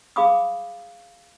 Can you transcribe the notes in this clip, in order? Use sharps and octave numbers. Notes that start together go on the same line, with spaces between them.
G#4 F5 B5 D6 D#6